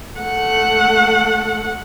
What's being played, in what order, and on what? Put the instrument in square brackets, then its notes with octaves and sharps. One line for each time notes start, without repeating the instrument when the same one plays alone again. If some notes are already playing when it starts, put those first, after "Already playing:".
[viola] A3 F#5